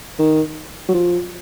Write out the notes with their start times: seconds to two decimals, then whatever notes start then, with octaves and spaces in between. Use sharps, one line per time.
0.19 D#3
0.89 F#3
0.94 F3